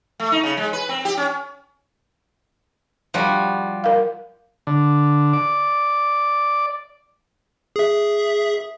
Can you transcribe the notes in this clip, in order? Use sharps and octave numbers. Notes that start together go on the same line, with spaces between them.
A3
D#4
C#3
G#3
B4
C4
G4
C#4
F3 G3 F#4
A#4 F5
D3
D5
G#4 E5